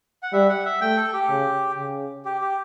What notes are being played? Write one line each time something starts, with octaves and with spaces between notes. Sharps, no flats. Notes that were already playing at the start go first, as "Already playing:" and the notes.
F#5
G3 E5
F#5
E5
A3 G5
A4
G4
C#3
C#3
G4
G4